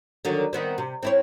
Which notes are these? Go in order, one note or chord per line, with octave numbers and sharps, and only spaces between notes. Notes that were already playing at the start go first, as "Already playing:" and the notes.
D3 D#3 F#3
D#3 B3 C4
C3
C4 E4 C#5